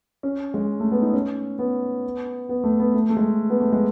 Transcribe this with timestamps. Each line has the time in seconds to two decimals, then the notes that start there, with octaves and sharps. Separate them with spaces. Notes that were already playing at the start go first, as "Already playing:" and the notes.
0.23 C#4
0.54 G#3
0.80 A3
0.92 B3
1.02 D#4
1.14 C#4
1.59 B3
2.49 B3
2.64 A3
2.79 B3
2.94 A3
3.10 A3
3.17 G#3
3.50 B3
3.61 A3
3.72 G#3